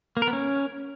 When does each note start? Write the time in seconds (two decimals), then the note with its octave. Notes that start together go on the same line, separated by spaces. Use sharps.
0.17 A#3
0.22 A#4
0.27 B3
0.33 C#4